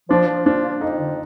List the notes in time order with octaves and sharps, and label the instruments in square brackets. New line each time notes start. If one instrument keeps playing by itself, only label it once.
[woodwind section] F3 [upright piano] D4
[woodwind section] F3
[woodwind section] F3 [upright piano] D4
[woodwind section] A#3
[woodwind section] F2 [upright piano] D#4
[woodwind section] D3